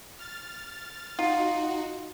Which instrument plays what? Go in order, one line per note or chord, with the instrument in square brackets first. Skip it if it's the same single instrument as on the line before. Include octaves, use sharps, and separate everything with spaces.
[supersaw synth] F6 A6
[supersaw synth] D#4 F#4 [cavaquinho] F4